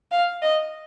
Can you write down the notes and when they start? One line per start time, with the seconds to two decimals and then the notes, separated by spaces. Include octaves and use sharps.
0.11 F5
0.42 D#5